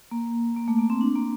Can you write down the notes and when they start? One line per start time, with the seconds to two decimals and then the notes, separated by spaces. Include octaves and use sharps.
0.11 A#3
0.56 A#3
0.68 A3
0.79 A#3
0.90 C4
1.01 D4
1.15 A#3